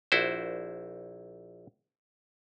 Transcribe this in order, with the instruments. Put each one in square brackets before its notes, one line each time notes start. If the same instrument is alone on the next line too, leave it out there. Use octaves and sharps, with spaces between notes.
[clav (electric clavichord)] A#1 E4 F#4 C5